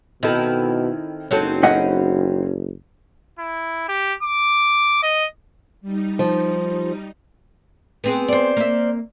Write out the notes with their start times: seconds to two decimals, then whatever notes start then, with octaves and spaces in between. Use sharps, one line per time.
0.23 B2 D#3 C4 E4 A4
1.31 F#1 F#3 C4 D#4 A4 C#5
1.63 C#4 D#4 E4 D#5 F#5
3.39 E4
3.88 G4
4.23 D6
5.03 D#5
5.81 G3 D#4
6.19 F3
8.04 B3 C4 G#4
8.28 C5 D5
8.57 A#3 E5